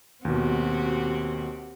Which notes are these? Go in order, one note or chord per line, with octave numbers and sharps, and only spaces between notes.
D#2 B2 C4 F#4 G4